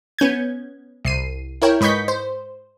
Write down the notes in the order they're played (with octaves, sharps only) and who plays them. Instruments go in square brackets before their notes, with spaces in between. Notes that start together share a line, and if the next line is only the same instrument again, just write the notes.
[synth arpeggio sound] B3 C#4 G6 G#6
C2 C7 D#7
E4 A#4 C#5 G5
G#2 B4 D#5 C#6 G6 B6
C5